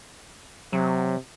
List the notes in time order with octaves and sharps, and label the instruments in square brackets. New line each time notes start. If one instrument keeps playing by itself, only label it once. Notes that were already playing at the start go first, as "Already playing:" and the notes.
[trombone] C3 [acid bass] F#3